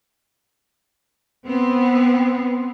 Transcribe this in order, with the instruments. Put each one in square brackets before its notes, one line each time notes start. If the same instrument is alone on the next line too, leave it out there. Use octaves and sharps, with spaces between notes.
[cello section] B3 C4